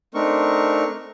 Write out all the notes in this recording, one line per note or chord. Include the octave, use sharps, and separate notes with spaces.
A3 C4 D4 D#4 A#4 C#6